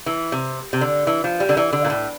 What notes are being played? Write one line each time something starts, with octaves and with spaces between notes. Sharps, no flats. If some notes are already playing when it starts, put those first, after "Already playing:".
E3
C3
C3
D3
E3
F3
G3
D3
E3
D3
A#2
A2